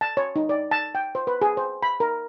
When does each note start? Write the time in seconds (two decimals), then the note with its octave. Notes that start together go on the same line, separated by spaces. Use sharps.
0.01 A5
0.17 C#5
0.36 D#4
0.49 D5
0.71 A5
0.95 G5
1.15 C5
1.27 B4
1.42 G#4
1.57 C5
1.83 B5
2.00 A#4